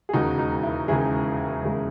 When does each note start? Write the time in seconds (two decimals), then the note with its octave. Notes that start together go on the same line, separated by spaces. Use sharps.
0.09 G#4
0.13 E1 D#2 C#3 G#3 D#4 F#4
0.39 D#4
0.63 E4
0.88 E1 D#2 C#3 G#3 E4 G#4
1.63 E1 D#2 C#3 G#3